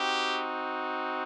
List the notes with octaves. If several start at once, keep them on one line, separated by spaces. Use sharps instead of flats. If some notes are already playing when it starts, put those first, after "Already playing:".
Already playing: C4 D#4 F#4 G4